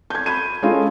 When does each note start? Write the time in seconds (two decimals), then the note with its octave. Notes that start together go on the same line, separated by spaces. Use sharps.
0.10 G6 G#6
0.26 B5 G#6 D#7
0.62 G#3 C#4 F4 A4